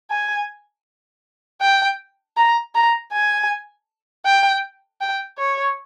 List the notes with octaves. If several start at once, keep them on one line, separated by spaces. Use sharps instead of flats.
G#5
G5
A#5
A#5
G#5
G5
G5
C#5